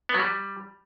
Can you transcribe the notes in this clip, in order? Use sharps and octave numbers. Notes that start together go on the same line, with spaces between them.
B3
F#3
G3